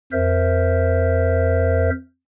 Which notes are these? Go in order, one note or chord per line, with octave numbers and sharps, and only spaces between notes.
F2 A#4 C5 E5